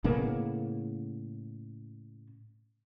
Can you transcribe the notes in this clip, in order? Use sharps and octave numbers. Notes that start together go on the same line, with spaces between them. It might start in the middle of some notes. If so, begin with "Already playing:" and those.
A2 C#3 A#3 B3